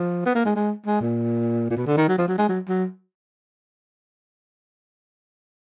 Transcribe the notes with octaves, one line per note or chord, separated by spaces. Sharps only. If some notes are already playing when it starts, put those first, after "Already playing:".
Already playing: F3
B3
A#3
G#3
G#3
G#3
A#2
A#2
B2
D3
D#3
F#3
F3
F#3
G#3
F#3
F#3